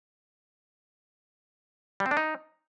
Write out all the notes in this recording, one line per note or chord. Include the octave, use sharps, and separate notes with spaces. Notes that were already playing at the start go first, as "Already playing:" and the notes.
G3
C4
D4
D#4